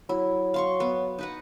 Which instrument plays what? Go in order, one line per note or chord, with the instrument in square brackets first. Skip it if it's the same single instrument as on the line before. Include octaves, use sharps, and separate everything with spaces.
[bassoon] F#3 [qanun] E4
[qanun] F5 C6 C#6
B3
D#4 B4 F#5